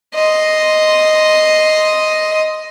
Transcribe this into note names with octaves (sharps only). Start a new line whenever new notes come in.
D#5 C6